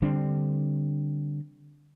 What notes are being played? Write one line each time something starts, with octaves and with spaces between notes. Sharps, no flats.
D3 G3 C4 D4